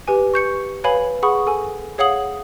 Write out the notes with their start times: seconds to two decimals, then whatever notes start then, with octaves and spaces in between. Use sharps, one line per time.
0.08 G4 B4 G#5
0.34 C#6 G6 C#7
0.84 B4 C#5 F5 G#5 B5 F#7
1.23 G#4 F#5 B5 C#6 D#6
1.47 A4 G#5
1.98 G#4 C#5 F5 F#5 D#6 F#7